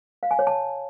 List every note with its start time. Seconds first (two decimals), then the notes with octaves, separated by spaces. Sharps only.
0.23 F5
0.31 G#5
0.39 C#5
0.47 A5